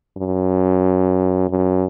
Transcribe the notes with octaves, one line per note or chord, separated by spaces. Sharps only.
F#2
F#2